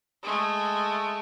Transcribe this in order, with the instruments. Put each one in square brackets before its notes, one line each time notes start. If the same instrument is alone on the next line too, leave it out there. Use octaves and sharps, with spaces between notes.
[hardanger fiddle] G#3 A3